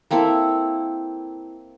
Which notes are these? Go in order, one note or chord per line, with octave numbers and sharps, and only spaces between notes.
A#3 C4 E4 A4